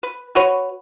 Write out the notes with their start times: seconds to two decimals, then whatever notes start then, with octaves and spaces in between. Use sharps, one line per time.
0.03 B4
0.35 F#4 B4 C#5